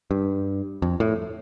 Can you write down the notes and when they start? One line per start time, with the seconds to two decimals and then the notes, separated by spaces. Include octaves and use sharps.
0.11 G2
0.82 F2
1.00 A2